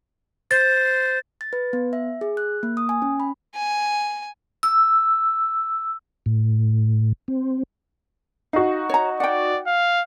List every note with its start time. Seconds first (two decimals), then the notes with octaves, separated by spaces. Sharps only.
0.51 C5 A6
1.41 A6
1.53 B4
1.73 B3
1.93 E5
2.21 G#4
2.37 F#6
2.63 A#3
2.77 D#6
2.89 G#5
3.02 C#4
3.20 B5
3.55 G#5
4.63 E6
6.26 A2
7.28 C4
8.53 D#4 F#4 F5
8.89 C#5 A#5
9.20 D5 F#5 G5
9.67 F5